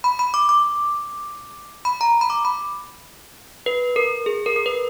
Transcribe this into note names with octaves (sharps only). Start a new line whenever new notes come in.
B5
B5
D6
D6
B5
A#5
B5
D6
B5
B4
A#4
G#4
A#4
A#4
B4